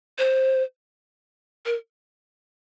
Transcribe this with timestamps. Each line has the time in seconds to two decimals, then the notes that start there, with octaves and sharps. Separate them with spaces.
0.18 C5
1.65 A#4